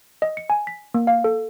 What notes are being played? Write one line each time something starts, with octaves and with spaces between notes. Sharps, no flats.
D#5
C#7
G#5
B6
A#3
F5
A4